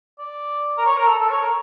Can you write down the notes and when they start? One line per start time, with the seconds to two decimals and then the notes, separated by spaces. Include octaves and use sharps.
0.18 D5
0.78 A#4
0.85 C#5
0.97 A#4
1.07 A4
1.19 A4
1.30 C#5
1.41 A#4